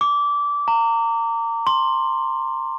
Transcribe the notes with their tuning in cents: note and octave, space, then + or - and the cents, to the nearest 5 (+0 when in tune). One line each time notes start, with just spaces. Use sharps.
D6 -20
A#5 -30
C6 +15